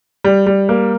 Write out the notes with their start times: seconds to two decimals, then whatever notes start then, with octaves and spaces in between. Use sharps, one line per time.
0.24 G3
0.47 G3
0.69 A#3